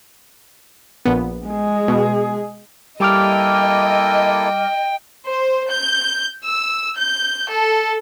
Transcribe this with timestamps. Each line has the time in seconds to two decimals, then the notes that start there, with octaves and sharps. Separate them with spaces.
1.05 A#1 B3
1.47 G#3 G#4
1.88 B2
3.00 G3 A#3 E4 A4 D#5 G5 D6 F6
5.27 C5
5.70 G6
6.44 E6
6.97 G6
7.51 A4